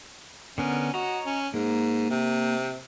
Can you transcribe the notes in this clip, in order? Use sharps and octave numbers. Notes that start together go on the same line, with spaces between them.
D3 B3 C#4 A#4
F#4 C#5 D#5 A#5
C#4
G#2 A#3
C3